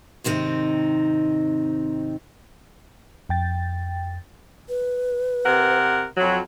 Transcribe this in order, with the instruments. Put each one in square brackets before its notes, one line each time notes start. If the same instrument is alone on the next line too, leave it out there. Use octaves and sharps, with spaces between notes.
[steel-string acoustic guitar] G#2 C3 D#3 C4 D#4
[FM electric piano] F2 G5 A6
[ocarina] B4
[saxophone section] C3 A#4 F#5
F2 F#3